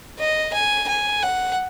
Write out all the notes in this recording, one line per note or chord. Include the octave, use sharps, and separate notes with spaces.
D#5
G#5
G#5
F#5